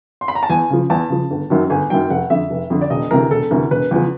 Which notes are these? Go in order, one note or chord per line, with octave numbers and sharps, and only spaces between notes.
C6
B5
A#5
A5
E2 G#5
C#3 F3
E2 A5
C#3 F3
G1
F#2 D#3 F#3
G1 G#5
F#2 D#3 F#3 G5
F1 F#5
F2 D3 E5
F1
F2 D3
D5
E1 D#5
D2 C3 E3 A#4
E1 A4
D2 C3 E3 A#4
E1 B4
E2 C#3 F3